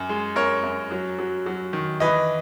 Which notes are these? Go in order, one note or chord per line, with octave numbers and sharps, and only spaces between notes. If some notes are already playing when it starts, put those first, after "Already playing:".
Already playing: F#2
G#3
F#2 A#4 C#5
F#2
F#3
F#3
F#3
D#3
E3 B4 D#5